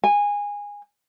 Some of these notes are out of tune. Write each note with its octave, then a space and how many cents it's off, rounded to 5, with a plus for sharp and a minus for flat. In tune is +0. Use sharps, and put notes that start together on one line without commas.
G#5 -20